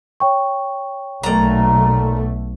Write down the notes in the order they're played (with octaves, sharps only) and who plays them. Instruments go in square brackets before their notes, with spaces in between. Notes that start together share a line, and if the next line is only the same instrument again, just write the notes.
[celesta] C#5 G5 C#6
[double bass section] B1 A3 [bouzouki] A#2 A#5